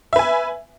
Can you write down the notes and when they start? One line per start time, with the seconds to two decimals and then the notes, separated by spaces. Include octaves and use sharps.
0.13 E5
0.16 B4
0.19 G#5